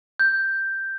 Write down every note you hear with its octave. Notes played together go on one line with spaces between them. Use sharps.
G6